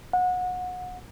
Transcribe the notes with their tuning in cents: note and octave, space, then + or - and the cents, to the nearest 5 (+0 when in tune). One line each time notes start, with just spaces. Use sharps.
F#5 -25